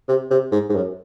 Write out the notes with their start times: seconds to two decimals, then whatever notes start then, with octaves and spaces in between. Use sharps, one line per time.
0.08 C3
0.31 C3
0.52 G#2
0.69 G#2
0.75 F#2